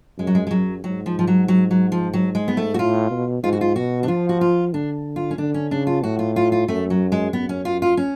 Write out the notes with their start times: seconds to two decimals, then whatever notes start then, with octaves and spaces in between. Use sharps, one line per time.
0.18 F#2 G#3
0.27 F#3
0.35 G#3
0.47 G#3
0.51 F#2 F#3
0.84 G#2 F#3
1.06 F3
1.19 F3
1.27 F#3
1.48 F#3
1.71 F#3
1.92 F3
2.13 F#3
2.35 G#3
2.48 B3
2.57 A3
2.74 F#4
2.79 A2 F4
3.11 B2
3.43 G#2 F4
3.53 F#4
3.61 F4
3.76 B2 F#4
4.03 D4
4.08 F3 F4
4.29 F#4
4.41 F4
4.73 D3 D4
5.16 F4
5.31 C#4
5.38 D3 D4
5.54 C#4
5.71 C#3 D4
5.87 F4
6.03 A2 F#4
6.19 F4
6.36 F4
6.52 F4
6.68 F#2 A3
6.90 F#3
7.12 G#3
7.33 F#2 B3
7.49 C#4
7.65 F4
7.82 F4
7.97 C#4